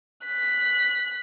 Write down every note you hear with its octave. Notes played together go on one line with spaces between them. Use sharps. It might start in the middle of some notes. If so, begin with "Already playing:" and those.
F#6 B6